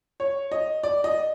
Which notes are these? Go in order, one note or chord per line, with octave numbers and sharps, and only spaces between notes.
C#5
D#5
D5
D#5